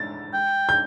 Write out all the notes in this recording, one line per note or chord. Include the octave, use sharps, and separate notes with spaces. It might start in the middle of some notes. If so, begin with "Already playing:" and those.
Already playing: A6
G5
G6